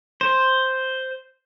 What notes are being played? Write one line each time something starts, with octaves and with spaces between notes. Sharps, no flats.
C5